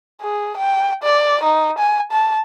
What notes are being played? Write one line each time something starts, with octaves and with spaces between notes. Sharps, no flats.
G#4
G5
D5
D#4
G#5
A5